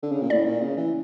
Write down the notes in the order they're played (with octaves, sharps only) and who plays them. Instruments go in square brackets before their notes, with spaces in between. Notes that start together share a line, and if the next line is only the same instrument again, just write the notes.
[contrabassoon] D3
C#3
A#2
[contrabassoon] A2 [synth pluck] D5
[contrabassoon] A#2
C#3
E3